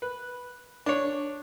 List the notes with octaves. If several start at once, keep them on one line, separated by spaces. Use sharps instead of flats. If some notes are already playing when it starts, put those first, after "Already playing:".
B4
D4 C#5